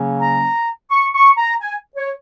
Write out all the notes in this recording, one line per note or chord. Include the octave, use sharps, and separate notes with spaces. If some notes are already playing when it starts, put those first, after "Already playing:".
Already playing: C#3 F#3 A#3 C#4
A#5
C#6
C#6
A#5
G#5
C#5